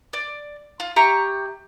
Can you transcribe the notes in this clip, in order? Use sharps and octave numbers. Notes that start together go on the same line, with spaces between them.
D5
F4
G4 E5 A#5 C#6